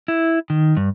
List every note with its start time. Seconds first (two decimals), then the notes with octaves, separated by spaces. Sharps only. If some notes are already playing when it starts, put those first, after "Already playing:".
0.08 E4
0.50 D#3
0.77 G2